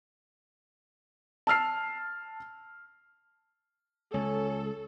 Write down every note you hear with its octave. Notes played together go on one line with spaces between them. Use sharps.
A5 E6 F6 C7
C#2 C#4 A4